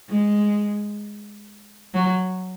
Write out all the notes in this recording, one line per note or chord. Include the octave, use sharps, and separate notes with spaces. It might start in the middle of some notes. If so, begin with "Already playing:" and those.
G#3
F#3